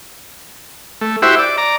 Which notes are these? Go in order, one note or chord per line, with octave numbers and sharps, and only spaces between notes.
A3
E4 F#4 G4 C5 E5
D5
D5 A#5